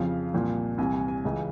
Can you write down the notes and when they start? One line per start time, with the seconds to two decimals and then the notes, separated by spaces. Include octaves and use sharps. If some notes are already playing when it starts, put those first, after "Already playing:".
Already playing: F2 C#3 F3 F5
0.34 C2 A#2 F3
0.78 C2 C3 E3 G#5
0.94 G#5
1.08 G#5
1.25 C#2 C#3 E3